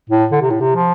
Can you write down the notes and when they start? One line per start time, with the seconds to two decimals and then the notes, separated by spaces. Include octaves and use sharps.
0.10 A2
0.32 D3
0.42 C3
0.50 A2
0.60 C3
0.75 F3